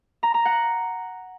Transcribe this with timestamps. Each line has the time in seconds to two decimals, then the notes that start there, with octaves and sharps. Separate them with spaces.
0.23 A#5
0.34 A#5
0.45 F#5